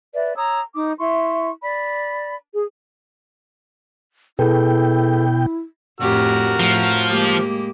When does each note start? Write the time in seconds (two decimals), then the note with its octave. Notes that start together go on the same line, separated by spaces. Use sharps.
0.14 B4 D5 E5
0.36 C#5 A#5 D#6 E6
0.74 D#4 D6 D#6
0.98 E4 E5 C6 C#6
1.62 D5 B5
2.53 G#4
4.39 B2 E4 G#4 A4 B4 G5
6.01 F2 A2 F#4 G4 A#4 F6
6.60 A2 F3
7.09 G#3 A#3 G4